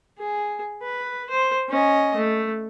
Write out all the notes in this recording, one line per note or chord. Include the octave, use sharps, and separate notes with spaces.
G#4
B4
C5
C#4 D#5
A3